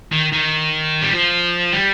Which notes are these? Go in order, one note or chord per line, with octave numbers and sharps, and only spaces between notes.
D#3
D#3
G3
F3
G3